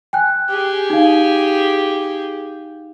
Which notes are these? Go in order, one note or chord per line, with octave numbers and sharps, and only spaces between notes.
G5 G#5 F#6
G4 G#4
D#4 F5